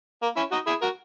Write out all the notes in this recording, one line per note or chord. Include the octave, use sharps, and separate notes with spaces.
A#3
C#4 E4
D#4 F#4
E4 G#4
F#4 A#4